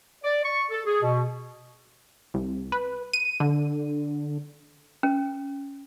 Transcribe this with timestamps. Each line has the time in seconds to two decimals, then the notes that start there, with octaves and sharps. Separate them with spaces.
0.24 D5
0.44 C#6
0.71 A4
0.85 G#4
1.02 B2
2.34 C2
2.72 B4
3.13 D#7
3.40 D3
5.03 C#4